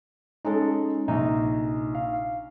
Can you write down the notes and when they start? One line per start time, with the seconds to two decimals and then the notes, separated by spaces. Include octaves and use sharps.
0.45 G#3 C#4 D#4 A4
1.08 A#1 C3 D#4
1.95 F5